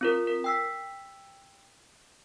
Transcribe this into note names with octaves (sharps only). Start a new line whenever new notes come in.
C4 F4 A#4
A#4
G5 E6 B6